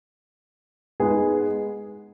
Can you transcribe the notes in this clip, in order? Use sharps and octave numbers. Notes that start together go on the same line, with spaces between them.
G#3 B3 D#4 G#4